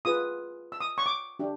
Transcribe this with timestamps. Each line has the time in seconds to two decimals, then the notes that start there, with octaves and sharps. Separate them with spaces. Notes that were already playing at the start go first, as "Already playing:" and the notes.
0.05 F4 G#4 B4 D#6
0.72 E6
0.81 D#6
0.98 C#6
1.06 D6
1.39 D4 G4